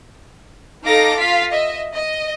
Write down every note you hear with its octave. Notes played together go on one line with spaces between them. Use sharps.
D#4 A4 F5 D6 A#6
F4 F5 B6
D#5 E5
D#5